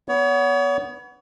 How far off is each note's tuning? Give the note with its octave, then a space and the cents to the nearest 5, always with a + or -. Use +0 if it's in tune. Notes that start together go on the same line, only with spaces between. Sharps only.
B3 +0 C#5 +35